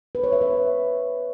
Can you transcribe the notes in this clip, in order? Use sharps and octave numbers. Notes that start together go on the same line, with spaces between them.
B4
C#5
E5
B4